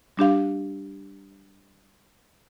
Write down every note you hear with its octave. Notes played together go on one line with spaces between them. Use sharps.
G3 D4 G4 F5